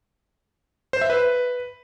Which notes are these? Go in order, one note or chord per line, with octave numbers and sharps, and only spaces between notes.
C5
E5
B4